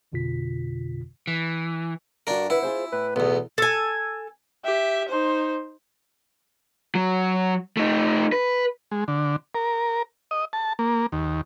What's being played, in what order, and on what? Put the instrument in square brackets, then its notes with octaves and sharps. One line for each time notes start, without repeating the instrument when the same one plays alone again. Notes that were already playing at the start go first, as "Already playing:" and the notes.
[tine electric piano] A1 F2 B2 D3 F4 B6
[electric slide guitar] E3
[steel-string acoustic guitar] G2 F#4 [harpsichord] D4 A#4
[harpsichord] E4 [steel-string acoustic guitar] B4 F#5
[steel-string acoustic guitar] F4 G#4 C5
[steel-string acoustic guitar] A2 [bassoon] B4
[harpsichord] B1 E2 [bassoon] B3
[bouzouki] A4 G#5
[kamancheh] G4 E5
D#4 C5
[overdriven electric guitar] F#3
A3 D#4
B4
[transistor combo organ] G#3
D3
A#4
D#5
A5
A#3
D#2